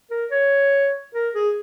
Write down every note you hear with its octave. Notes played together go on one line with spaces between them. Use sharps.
A#4
C#5
A#4
G#4